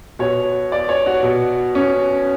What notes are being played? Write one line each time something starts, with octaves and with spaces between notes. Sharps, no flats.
B2 C#5
D5
C#5
F#4
B2
C#4